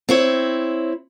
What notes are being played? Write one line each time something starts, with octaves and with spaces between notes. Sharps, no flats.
C4 E4 C#5